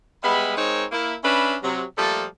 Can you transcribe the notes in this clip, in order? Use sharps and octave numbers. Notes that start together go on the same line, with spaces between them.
G3 G#3 B3 E5 B5
G#3 C4 D#4 A#4 C#5
A#3 E4
C#4 D4 B4 E5 B5
C3 F#3
F3 G3 A3 A#3 A4